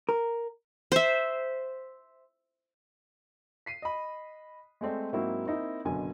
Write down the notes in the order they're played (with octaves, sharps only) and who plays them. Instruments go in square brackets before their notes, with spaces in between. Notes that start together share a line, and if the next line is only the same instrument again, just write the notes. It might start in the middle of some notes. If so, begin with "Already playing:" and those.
[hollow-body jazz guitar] A#4
[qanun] C5 E5
[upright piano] B6 C7 D#7
D#5 B5
G#3 A3 C4 D5
G#2 F#3 A#3 C4 E4 F#4
A#3 C4 D#4 E4
F#1 B2 D3 G#5